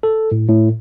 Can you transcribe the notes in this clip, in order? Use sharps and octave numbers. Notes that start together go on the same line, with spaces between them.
A4
A2
A2